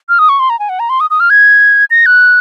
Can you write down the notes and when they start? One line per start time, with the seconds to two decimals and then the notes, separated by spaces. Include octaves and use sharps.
0.09 F6
0.19 D#6
0.29 C#6
0.40 C6
0.50 A#5
0.59 G#5
0.69 F#5
0.80 A#5
0.90 C6
1.00 D#6
1.10 D#6
1.20 F6
1.30 G#6
1.90 A#6
2.06 F#6